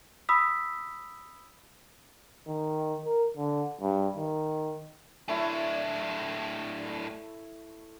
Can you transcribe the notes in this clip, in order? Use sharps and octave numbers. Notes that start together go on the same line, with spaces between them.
B5 D#6 E6 B6
D#3
A#4
D3
G2
D#3
A2 A3 D4 E4 C#5